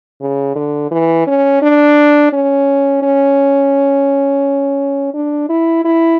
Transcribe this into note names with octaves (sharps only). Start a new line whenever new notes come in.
C#3
D3
E3
C#4
D4
C#4
C#4
D4
E4
E4